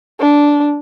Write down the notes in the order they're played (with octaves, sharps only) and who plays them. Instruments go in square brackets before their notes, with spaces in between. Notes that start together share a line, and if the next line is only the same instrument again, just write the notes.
[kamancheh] D4